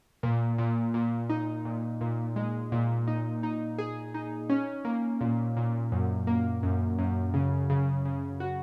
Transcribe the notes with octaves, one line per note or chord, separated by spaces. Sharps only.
A#2
A#2
A#2
D#4
A#2
A#2
G#3
A#2
D#4
D#4
G#4
D#4
C#4
A#3
A#2
A#2
F#2
A#3
F#2
F#2
C#3
C#3
C#3
F#4